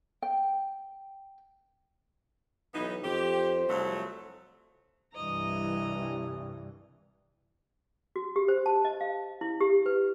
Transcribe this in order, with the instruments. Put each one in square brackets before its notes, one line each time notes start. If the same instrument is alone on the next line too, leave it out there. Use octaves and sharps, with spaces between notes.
[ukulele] G5
[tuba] B1 [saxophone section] E3 B3 D#4
[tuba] F2 [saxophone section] G4 [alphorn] C5
[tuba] C2 [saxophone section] F2 F#3 A3
[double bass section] C2 G2 E3 [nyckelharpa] D#5 A#5
[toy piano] F#4
G4
C5
A5
D#5
F5
E4
G4
B4